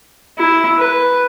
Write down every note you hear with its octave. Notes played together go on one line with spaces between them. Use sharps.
E4
B4